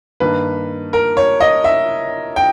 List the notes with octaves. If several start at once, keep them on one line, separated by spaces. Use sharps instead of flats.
G2 D#3 A#3 B4
A#4
C#5
D#5
E5
G5